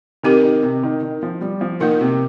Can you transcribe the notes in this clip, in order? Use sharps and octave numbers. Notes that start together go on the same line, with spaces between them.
D#3 C4 G4 A#4
D#3
C3
D#3
D#3
F3
G3
F3
D#3 A#3 F4 A#4
C3